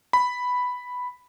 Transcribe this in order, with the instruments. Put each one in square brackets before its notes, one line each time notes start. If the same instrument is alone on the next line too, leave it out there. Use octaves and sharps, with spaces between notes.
[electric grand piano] B5